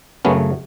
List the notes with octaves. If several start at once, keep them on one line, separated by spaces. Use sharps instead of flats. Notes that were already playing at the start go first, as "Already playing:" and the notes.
F#2 C#3 F#3 A3 B3 C#4